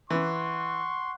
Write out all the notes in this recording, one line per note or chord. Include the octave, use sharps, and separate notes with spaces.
E3 F#5 C6 C#6